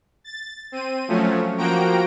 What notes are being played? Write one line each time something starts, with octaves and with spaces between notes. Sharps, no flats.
A6
C4 D#7
F3 F#3 A3 C#4
F3 A#3 F#4 G5 A#5 D7